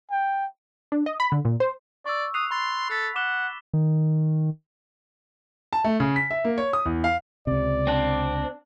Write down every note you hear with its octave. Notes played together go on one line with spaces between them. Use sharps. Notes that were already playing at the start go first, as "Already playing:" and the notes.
G5
D4
D#5
B5
D3
A#2
C5
D5 C#6 E6
D#6 F#6 C7 F7
B5 C6 A6
A4 F#6 B6
F#5 D6 E7 G7
D#3
A5
A3
C#3
B6
E5
A#3
C#5
D#6
E2
F5
C#2 C3 D5
C4 D4